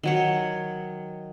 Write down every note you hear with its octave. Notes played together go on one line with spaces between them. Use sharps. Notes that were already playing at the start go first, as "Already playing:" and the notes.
D#3 F#3 C#5